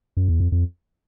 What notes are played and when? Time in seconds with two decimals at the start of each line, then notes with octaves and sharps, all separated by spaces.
0.17 F#2
0.28 E2
0.40 F2
0.52 F2